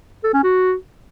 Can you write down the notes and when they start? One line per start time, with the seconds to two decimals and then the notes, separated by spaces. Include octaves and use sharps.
0.24 A4
0.33 C#4
0.43 F#4